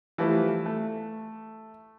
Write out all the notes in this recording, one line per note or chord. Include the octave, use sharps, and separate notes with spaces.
E3 F3 G3 A3 B4
A3